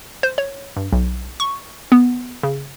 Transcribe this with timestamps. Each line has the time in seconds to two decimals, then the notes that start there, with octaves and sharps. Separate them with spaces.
0.23 C5
0.38 C#5
0.76 G2
0.93 B1
1.40 C#6
1.92 B3
2.43 C#3